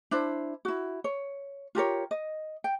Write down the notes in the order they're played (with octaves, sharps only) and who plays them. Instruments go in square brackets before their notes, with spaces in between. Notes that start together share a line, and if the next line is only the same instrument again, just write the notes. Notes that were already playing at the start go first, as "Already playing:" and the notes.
[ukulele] D4 E4 C5
E4 F#4
C#5
F4 G4 A#4 C#5
D#5
G5